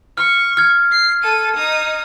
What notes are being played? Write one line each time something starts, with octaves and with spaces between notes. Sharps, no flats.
C#6 F6
F6 G#6
C7
A4 D#7
D#4 D#6